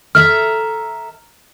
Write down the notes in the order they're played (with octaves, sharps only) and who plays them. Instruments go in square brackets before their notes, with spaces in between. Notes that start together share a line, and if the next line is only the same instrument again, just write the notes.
[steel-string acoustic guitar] A4 E5 A#5 [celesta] F6